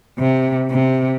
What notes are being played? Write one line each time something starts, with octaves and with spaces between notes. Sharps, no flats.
C3
C3